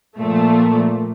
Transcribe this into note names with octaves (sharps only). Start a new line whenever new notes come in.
A#2 F3 A3